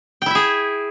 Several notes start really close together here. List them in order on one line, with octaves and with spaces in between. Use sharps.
G5 E4 E5 G#4